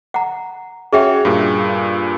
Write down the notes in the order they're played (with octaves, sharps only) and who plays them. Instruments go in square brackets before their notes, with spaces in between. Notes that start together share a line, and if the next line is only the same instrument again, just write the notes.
[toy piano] F#5 A#5
[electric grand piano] C#4 F#4 C#5 [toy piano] G#4 E5 G5
[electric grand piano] G2 A#2